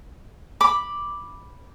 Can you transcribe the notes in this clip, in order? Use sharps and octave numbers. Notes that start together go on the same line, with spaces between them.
B5 D6